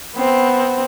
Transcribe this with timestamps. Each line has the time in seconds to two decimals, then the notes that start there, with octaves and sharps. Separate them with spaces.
0.15 B3 C4